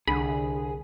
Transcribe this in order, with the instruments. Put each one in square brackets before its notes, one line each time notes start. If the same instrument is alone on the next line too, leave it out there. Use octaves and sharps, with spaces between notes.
[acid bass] C2 [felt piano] D3 [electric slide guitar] G#4 [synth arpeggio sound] B5